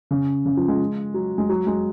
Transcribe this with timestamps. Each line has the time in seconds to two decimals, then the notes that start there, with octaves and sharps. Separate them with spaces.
0.11 C#3
0.46 C#3
0.57 F3
0.68 G#3
1.14 F#3
1.38 G#3
1.49 F#3
1.67 G#3